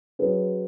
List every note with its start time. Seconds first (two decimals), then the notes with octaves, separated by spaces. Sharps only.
0.19 F#3 C#4 G#4 B4